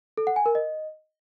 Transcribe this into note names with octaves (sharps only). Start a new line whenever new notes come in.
A4
F#5
G#5
A#4
D#5